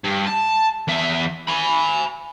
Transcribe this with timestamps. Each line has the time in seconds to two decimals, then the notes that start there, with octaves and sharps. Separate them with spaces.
0.04 G2
0.27 A5
0.88 E2 E5
1.47 G#5 B5